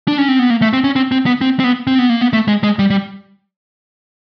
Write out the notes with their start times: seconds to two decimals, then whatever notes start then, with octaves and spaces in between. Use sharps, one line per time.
0.08 D4
0.18 C#4
0.28 C4
0.39 B3
0.50 A#3
0.62 A3
0.73 C4
0.84 C#4
0.96 C4
1.12 C4
1.26 B3
1.41 C4
1.60 C4
1.64 B3
1.87 C4
1.99 B3
2.09 A#3
2.21 B3
2.33 A3
2.48 G#3
2.63 G#3
2.79 G3
2.90 G3